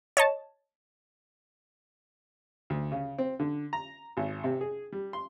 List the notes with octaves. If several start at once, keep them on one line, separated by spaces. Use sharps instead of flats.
C#5 D#5 A5
D2
C#3
C4
D3
A#5
G#1
C3
G#4
G3
C6